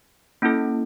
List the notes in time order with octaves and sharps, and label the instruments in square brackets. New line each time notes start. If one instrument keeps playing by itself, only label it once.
[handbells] A#3 C#4 E4 A4